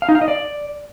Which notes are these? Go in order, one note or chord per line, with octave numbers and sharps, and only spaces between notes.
F5
D#4
F5
D#5
D5